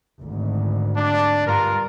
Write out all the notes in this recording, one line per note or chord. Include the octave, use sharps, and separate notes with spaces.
G#1 D2
D4
G2 F4 A#4